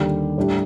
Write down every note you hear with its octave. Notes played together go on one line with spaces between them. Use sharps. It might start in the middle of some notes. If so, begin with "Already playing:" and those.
Already playing: D#2 D3 G3 D4 G4
A2 G3 D4 G4